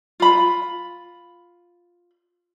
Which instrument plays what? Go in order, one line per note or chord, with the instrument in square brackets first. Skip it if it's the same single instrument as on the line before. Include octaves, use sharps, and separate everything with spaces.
[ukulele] F4 B5